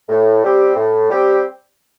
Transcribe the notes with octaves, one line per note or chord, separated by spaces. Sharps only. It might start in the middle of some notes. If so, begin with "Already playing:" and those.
A2
G3 C4 G4
A2
G3 C4 G4